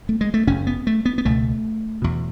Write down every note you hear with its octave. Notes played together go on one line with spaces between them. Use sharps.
A3
G#3
A3
F#1 F#2 C#3 C#4
B3
A3
B3
B3
C#2 B2 A3
E2 B2